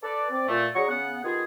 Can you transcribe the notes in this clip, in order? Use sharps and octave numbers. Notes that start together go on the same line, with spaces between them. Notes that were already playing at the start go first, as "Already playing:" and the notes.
A4 B4 D5
C4 D5
A#2 A3
F#3 D4 G#4 F#5 A#5 C#6
C#3 B3 F#5
D#3 B3 F4 G4 G#4